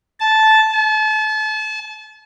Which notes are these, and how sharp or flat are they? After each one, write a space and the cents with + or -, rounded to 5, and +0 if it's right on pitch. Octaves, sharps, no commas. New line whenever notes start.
A5 -10
A5 -35